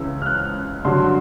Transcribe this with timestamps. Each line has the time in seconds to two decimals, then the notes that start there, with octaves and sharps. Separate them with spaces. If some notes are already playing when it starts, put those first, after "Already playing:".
Already playing: C#2 C#3 E3 E6
0.22 F6
0.26 F#6
0.85 G2 D3 F#3 C6